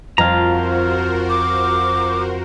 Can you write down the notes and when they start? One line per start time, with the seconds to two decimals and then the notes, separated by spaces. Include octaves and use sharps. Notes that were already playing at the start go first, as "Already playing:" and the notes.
0.18 F2 F4 F#4 A#4 C5 A5 A#5
1.30 D6